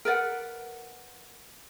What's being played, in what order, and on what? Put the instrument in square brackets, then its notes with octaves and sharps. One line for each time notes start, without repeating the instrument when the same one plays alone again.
[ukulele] A#4 B4 D5 F#5